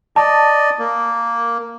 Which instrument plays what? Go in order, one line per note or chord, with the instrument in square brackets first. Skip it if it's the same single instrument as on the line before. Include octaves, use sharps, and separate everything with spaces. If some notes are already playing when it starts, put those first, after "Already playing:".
[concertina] D5 D#5 [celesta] A5
[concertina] A#3